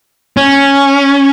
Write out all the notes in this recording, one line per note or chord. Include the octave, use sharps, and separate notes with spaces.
C#4